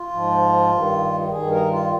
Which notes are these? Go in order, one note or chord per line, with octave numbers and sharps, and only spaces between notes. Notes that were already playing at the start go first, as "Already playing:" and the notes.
Already playing: F4
G#2 F3
G2 D#3
G2 D#3 G#4
A#4
F4